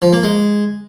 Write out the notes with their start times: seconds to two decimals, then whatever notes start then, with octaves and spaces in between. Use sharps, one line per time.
0.02 F3
0.13 A#3
0.23 G#3